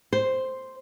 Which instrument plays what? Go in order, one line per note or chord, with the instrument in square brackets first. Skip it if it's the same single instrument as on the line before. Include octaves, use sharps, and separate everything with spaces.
[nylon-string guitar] C5